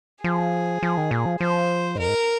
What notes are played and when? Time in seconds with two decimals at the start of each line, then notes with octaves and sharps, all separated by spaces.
0.24 F3 G#4
0.83 F3
0.97 D#3
1.11 A#2
1.26 F3
1.41 F3 C5
1.96 G#2
1.99 F2 A#4
2.08 G#2